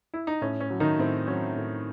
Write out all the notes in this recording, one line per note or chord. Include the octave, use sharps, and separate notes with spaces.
E4
D#4
A2 C#4
C#4
F#3
D#3 D#4
A2 C4
F#3 C#4
A2